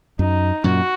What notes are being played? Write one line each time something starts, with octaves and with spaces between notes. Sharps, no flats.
F#2 D#4
F#2 A#2 F#4